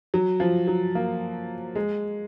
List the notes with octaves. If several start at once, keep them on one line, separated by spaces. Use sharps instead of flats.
F#3
F3
F#3
A#3
G#3